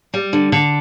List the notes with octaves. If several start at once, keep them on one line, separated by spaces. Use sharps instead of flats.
G3
D3
D3